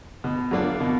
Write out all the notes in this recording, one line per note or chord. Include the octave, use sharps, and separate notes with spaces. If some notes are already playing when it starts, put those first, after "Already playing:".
B2
F#3 A#3 D4 F4
B2